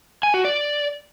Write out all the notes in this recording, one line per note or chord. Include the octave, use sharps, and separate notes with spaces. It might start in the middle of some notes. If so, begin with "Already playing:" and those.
G#5
F#4
D5